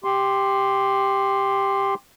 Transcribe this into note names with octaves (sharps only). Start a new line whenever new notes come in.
G4 C6